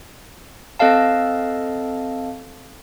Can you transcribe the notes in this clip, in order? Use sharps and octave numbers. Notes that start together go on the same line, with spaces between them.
C4 A4 D#5 F5 A5